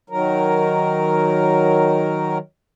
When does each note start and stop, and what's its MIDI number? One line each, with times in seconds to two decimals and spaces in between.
0.10 2.38 51
0.10 2.38 54
0.10 2.38 70